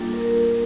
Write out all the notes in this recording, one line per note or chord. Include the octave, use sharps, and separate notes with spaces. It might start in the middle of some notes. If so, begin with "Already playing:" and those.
Already playing: G3 A#3 D4 F4 A4
A#4